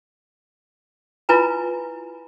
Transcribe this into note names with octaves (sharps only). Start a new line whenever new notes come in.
E4 F4 B4 G#5 A#5